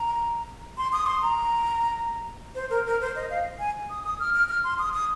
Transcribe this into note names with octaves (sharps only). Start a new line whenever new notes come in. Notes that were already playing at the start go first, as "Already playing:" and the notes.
Already playing: A#5
C6
D#6
C6
A#5
C5
A#4
A#4
C5
D#5
F5
G#5
D#6
D#6
F6
F6
F6
C6
D#6
D#6